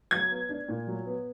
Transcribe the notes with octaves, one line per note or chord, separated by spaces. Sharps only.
F#3 G#6
B3
D4
A#2
F#3
B3